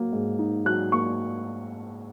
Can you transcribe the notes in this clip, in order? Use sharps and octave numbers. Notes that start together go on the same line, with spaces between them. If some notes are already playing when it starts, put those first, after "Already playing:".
Already playing: F#3 A#3
G#2
D#4
F#3 F#6
A#3 C#6